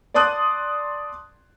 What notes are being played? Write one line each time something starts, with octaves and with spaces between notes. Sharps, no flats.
D5 A5 C6 D#6 F#6